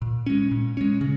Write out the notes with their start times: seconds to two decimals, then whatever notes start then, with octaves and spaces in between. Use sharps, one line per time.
0.02 A#2
0.26 G#3 C#4
0.51 A#2
0.77 G#3 C#4
1.01 C#3